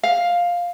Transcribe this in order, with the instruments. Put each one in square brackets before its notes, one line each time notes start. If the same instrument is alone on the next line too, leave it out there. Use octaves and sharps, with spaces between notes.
[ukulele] F5